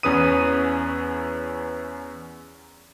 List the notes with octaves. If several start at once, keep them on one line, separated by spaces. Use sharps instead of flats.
E2 C#4 B4 D#6 D#7